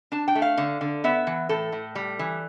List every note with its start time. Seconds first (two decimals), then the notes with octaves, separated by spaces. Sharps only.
0.12 D4 A5
0.28 G5
0.35 A3
0.42 F5
0.57 D3
0.81 D3
1.04 B3 E5
1.27 E3
1.49 A2 A4
1.72 A2
1.95 G3
2.19 E3